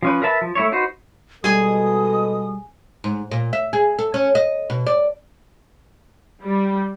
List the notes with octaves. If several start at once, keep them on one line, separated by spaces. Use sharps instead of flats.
F3 C#4 B4
A#4 B4 E5 A5 B5
F3
A3 E4 C#5
D#4 F#4 B4 C5
B2 G3 G#3 G#4 A4 G#5 D#6
G#2
A#2
E5
G#4
A4
C#4
D#5
B2
D5
G3